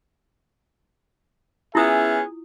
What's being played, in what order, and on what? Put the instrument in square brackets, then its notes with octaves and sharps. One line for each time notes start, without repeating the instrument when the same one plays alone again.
[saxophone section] B3 C#4 [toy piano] E4 F4 D#6 [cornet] G#4 [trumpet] E5